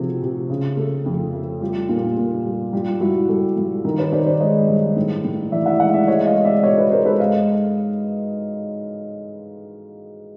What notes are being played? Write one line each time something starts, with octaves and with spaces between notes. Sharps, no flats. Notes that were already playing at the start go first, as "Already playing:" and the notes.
Already playing: C3 F3 A3 F#4 G#4
C3
C#3
A3
F2
A3
G3 F4 G4
A#2
A#2
G3
G2 F4 G4
G2 E4 F#4
G2 G4 A4
G2
D#3
B4 C#5
D#3 C5 D5
C5 D5
G#3 C#5 D#5
G2
A2
A2
E3 D5 E5
E5 F#5
G#3 E5 F#5
D5 E5
G#3 C#5 D#5
D#5 F5
G#3
D5 E5
B2 C#5 D#5
B4 C#5
G#3 A#4 C5
A4 B4
G#2 D#5 F5